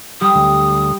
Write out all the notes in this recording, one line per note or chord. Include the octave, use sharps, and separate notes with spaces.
G3 D#6
D2